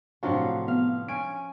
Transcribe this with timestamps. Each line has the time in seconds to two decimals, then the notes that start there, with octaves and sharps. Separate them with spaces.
0.23 A2 C3 F3 F#3 D4 C#5 F5
0.68 B3 F5
1.09 C#4 G#5 D7